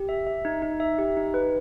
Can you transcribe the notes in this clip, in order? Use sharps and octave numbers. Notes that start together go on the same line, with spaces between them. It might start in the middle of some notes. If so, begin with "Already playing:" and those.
Already playing: G4
E5
E5
D#4
D#4
E5
G4
D#4
B4